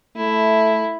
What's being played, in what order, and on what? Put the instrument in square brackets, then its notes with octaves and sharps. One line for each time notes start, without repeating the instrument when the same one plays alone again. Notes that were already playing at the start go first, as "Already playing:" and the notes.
[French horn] A3 [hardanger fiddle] E4